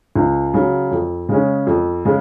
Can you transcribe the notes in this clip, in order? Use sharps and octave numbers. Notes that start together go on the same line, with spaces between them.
C#2
C#3 F#3
F2
C#3 G#3 C#4
F2
C#3 G#3